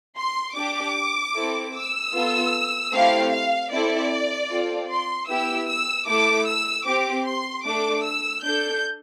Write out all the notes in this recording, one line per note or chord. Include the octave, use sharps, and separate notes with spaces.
C6
D4 G4 D6
C4 E4 A4
E6
B3 F4 A4
A3 C4 E4 G4 F5
F5
C4 E4 A4 D5
C4 F4 A4
C6
B3 E4 G4 E6
E6
A3 E4 A4 D6
E6
C4 G4 D6
C6
A3 D4 A4 D6
E6
D4 A4 G6